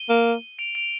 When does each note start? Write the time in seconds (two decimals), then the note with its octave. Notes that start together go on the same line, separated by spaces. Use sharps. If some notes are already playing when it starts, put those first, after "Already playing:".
Already playing: D#7 G7
0.09 A#3
0.59 D7 F7
0.75 D7 F7